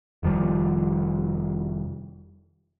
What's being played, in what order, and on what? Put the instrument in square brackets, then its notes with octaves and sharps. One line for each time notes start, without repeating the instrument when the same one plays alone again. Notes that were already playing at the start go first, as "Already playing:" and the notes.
[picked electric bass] F1 D#3 F3 G3